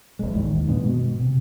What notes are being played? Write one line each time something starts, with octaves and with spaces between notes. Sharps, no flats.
E1 C2 G#3
A1 D#2 D#3
G2 A#2 G#3 B3
B2
C3